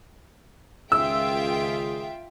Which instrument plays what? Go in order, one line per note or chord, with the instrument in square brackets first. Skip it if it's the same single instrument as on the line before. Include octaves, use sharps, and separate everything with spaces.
[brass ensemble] C#2 D#3 G#4 [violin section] F4 E5 G5 [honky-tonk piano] E6